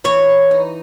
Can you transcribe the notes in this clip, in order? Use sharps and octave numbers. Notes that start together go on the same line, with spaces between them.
E3 C#5
D#4